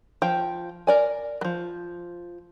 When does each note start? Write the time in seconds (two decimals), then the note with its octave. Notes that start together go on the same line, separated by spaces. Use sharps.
0.22 F3 G5
0.87 A#4 D5 G#5
1.41 F3 F#3